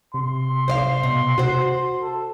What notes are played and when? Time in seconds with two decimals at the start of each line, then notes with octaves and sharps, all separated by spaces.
0.14 C3 C6
0.68 C5 D5 F5
1.03 B2
1.38 F#4 C5
2.00 A4